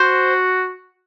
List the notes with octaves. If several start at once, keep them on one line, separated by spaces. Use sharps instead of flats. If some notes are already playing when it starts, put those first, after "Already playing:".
Already playing: F#4 C5